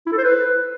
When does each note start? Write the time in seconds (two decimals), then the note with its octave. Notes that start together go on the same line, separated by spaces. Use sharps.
0.07 E4
0.12 A4
0.18 C5
0.24 B4